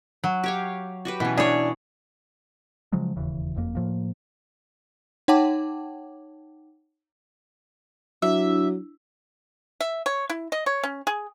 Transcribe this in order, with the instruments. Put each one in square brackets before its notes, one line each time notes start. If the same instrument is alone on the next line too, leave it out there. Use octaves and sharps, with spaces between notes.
[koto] F#3
[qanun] G4 C#5 F5
F#4 G4 B4
[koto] B2 [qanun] E3 C#4
[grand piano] D4 [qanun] E4 [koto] G#4 C#5
[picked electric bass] C#3 F3 F#3 G#3
E1 D#2 C#3 E3
F#1 F2 A#3
A2 F3 A#3
[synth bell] D#4 C#5 F#5 G5 A5 D6
[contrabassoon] F#3 [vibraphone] D4 E4 [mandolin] E5
[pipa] E5
C#5
E4
D#5
C#5
C#4
G#4